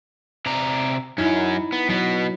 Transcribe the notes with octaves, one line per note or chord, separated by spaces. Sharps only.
C3 D5 A#5
F#2 C#4 D#4 E4
B3
B2 F#3 B3